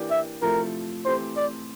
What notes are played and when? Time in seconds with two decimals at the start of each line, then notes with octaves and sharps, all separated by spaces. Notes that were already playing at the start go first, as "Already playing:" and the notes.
Already playing: E3 A#3 D4 G4 D5
0.11 E5
0.42 C3 F3 A3 E4 A#4
1.05 E3 A3 C4 G4 C5
1.37 D5